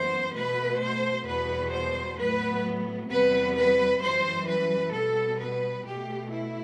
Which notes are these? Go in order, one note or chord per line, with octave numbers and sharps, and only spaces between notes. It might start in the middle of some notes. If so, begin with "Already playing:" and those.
Already playing: F#2 E3 G3 B3 C5
B2 A3 B4
C5
E2 B2 G3 B3 B4
C5
A2 F#3 B3 B4
E2 C3 G3 B3 B4
B4
F#2 E3 G3 C5
B4
B2 G3 B3 A4
B4
B2 A3 G4
E4